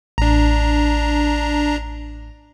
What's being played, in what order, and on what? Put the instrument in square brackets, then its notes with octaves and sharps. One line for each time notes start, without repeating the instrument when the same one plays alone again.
[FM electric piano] A1 [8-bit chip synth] D4 A#5